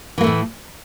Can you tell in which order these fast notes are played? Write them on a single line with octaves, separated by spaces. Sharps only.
E3 A#3 A3 A2